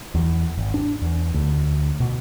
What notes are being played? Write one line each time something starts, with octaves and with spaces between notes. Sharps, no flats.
E2
G#1
D4
E2
D2
B2